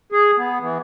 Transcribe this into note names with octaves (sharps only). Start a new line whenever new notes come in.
G#4
B3
E3